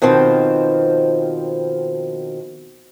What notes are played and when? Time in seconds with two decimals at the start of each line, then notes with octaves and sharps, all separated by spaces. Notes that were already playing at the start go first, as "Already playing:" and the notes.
0.02 B2 D#3 F3 C4